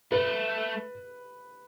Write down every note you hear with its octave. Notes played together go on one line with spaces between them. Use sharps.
A3 B4